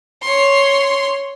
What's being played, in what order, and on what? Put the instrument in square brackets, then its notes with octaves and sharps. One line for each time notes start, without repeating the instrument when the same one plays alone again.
[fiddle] C#5 C6